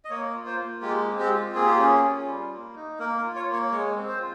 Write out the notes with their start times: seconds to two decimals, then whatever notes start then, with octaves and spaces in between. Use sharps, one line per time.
0.05 D#5
0.10 A#3 C#5
0.34 F4
0.46 C5
0.58 A#3
0.82 G#3 G4
1.07 C4
1.19 G4
1.30 F4
1.55 A#3 G#4
1.66 G4
1.78 C#4 G#4
2.02 F4
2.27 G3
2.51 A#3
2.75 D#4
2.99 A#3 A#4
3.17 A#4
3.23 F4
3.36 C#5
3.48 A#3 C#5
3.72 G#3 C#5
3.96 C4
4.08 C5
4.19 F4